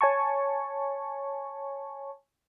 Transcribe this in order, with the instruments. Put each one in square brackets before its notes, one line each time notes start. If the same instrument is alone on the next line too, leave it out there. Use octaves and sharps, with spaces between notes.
[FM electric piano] C#5 G#5 A5 C#6